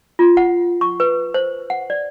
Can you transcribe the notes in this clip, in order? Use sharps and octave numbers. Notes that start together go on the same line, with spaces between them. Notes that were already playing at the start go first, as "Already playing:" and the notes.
F4
F#5
C#6
B4
C5
F#5
D5